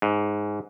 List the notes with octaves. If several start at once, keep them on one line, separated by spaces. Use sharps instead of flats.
G#2